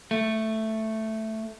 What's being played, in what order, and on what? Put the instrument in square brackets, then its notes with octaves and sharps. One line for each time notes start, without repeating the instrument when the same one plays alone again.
[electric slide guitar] A3